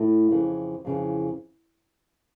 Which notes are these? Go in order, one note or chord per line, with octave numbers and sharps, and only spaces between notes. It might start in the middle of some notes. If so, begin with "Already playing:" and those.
Already playing: A2 A3
F2 C#3 E3
F2 C#3 E3